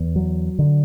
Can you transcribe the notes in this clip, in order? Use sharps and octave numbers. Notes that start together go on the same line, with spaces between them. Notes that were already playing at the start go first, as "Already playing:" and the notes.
Already playing: E2
F#3
D3